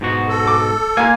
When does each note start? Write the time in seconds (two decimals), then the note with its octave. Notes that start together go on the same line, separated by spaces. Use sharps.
0.01 G#2 B2 F#4
0.29 A4
0.47 D6
0.97 A#2 A#3 G#5